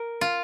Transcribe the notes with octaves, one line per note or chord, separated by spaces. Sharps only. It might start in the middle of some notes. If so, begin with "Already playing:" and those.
Already playing: A#4
F4